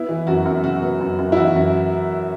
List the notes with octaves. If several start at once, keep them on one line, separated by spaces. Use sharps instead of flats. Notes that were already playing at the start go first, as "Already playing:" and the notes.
Already playing: B3 E4
E3
F#2 F#4
F#2
C#3 F#4
B3
F#2
F#2
E4
E3 F#4
F#2